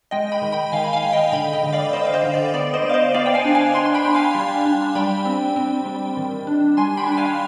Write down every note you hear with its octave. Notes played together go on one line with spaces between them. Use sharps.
G#3 D#5 G5
G5 B5
D#3
G5 B5
D#3 F5 G#5
B5
F5 G#5
G#3
D#5 G5
D3 G5 B5
D#5 G5
D3
D5 F5
D3 C5 D#5
F5
C5 D#5
D3
D5
B3 D5
C5 D#5
B3
F5
C5 D#5
B3 D5 F5
G5
F5 G#5
D4
F5 G#5
D4 G#5 C6
C6
G5 B5
D4
F5 G#5
G3
D4
G3 G5 B5
C4
C4
G3
D#3
D4
G3 G#5 C6
G5 B5
D4
G5
F5 G#5